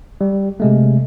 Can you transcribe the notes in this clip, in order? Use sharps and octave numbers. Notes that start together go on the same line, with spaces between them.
G3
C3 G#3 A3